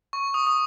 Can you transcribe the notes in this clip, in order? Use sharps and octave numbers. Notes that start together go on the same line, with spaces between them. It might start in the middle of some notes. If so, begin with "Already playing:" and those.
C#6
D#6
D#6